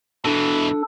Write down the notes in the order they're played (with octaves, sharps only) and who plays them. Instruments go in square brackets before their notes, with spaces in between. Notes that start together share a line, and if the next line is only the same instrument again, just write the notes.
[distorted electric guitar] B2 E3 [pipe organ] D4 A4